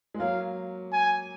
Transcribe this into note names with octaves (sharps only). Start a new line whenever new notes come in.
G#3
F#3 A#3 F5
G#5